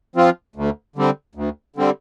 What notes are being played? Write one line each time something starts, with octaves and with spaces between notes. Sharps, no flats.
F3 C4 F4
D2
D3 G3 C4
D2
D3 G3 C4